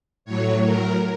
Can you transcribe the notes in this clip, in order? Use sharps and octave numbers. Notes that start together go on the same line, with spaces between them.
A2 F#3 C#5
A#4